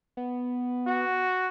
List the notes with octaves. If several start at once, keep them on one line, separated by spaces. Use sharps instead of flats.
B3
F#4